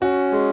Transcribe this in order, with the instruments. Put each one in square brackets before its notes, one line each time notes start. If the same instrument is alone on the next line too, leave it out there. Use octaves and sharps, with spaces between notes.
[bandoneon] C#4 [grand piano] F#4
[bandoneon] G#3 [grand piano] G#4